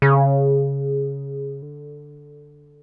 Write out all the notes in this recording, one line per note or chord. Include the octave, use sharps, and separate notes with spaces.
C#3
D3